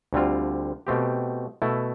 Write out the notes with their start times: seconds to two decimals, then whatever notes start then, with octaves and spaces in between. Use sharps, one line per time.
0.13 D2 D3 G3 C4 F4
0.87 B2 A3 C4 G4
1.62 B2 A3 E4